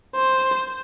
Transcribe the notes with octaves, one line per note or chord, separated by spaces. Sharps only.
C5